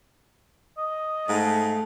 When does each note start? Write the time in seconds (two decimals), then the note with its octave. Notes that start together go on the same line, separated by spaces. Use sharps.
0.78 D#5
1.28 G#2 A3 G#4 F5